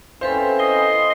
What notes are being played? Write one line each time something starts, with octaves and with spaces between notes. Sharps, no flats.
C4 C#4 E4 A4 B4 C5 F5
D#5 C6